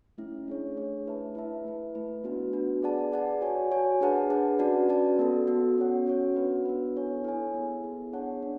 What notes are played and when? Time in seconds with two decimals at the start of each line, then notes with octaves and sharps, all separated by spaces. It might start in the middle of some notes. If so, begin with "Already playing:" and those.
0.18 A3 C#4 E4
0.48 A3 D4 G#4 C#5
0.76 A3 D4 G#4 C#5
1.06 E4 B4 E5 A5
1.35 E4 B4 E5 A5
1.64 A3 E4 B4
1.95 A3 E4 B4
2.24 B3 D4 F#4 B4
2.53 B3 D4 F#4 B4
2.82 G#4 B4 D5 F#5 A5
3.12 G#4 B4 D5 F#5 A5
3.41 F#4 C#5 G#5
3.72 F#4 C#5 G#5
4.01 D4 G#4 B4 F#5 A5
4.30 D4 G#4 B4 F#5 A5
4.59 C#4 F#4 B4 D5 A5
4.89 C#4 F#4 B4 D5 A5
5.19 B3 F#4 A4
5.47 B3 F#4 A4
5.78 C#4 F#4 C#5 F#5
6.06 C#4 F#4 C#5 F#5
6.36 B3 D4 F#4 B4
6.65 B3 D4 F#4 B4
6.96 E4 A4 C#5 G#5
7.24 E4 A4 C#5 G#5
7.54 B3 E4 G#4
7.84 B3 E4 G#4
8.13 D4 G#4 C#5 F#5 A5
8.42 D4